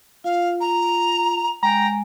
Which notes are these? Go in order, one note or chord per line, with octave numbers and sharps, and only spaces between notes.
F4 F5
A#5
G#3 G5 G#5 A#5